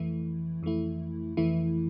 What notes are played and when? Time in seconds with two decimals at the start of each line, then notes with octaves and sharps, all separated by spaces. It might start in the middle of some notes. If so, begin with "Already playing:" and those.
Already playing: F2 E3 A3 E4
0.63 F2 E3 A3 E4
1.37 F2 E3 A3 E4